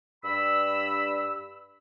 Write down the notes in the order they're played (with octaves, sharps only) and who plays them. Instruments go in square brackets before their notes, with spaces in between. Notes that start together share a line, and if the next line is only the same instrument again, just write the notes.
[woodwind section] G2 B5 E6